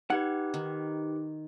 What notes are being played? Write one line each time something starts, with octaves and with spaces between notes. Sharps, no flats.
D#4 G4 B4 F#5
D#3